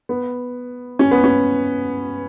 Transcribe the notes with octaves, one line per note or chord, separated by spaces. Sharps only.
B3
C#4
B3
C#4